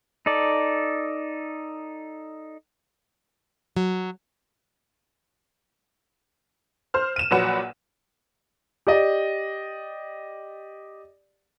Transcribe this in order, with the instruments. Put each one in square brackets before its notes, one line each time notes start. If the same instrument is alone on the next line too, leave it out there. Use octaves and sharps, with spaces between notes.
[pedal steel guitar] D#4 A4 D5
[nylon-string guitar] F#3
[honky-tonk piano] C5 F6
D#7 E7
A#1 A#2 F#3 B4 F#5 E7
[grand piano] G4 D5 D#5